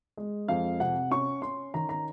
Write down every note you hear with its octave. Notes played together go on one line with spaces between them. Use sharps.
G#3
F2 F5
C3 F#5
C#4 C#6
C#4 C6
D#3 A#5
A#5